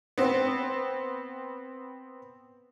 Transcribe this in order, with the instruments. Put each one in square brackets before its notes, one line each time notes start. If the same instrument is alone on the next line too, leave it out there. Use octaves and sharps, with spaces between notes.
[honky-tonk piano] B3 C4